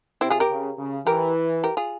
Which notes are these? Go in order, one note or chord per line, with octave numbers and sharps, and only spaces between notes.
C3 C4 E4
F4 G#4
G4 A#4
C#3
C#3
E3 G4 A#4
G4 A#4
F4 G#4